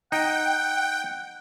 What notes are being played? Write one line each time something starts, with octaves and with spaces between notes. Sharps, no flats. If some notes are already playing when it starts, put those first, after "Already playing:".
D#4 F#5 G5